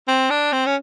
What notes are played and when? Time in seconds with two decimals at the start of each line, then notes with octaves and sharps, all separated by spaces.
0.08 C4
0.30 D4
0.53 C4
0.66 C#4